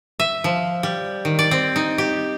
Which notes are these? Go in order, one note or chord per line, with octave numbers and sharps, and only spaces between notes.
E5
F3
G3
D#3
D5
C4
D#4
G4